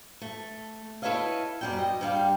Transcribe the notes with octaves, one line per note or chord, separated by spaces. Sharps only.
A3
E4 A4 B4 C#5 D#5 F5
F#2 G3 G5
D#5
G2 G3 F5 G5